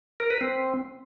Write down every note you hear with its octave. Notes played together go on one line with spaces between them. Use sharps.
A#4
B4
C4